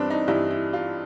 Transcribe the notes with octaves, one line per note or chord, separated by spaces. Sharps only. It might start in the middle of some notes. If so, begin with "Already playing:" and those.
Already playing: G2 E3 G3 B3 C4 D4
D#4
G2 E3 G3 E4
E4
F4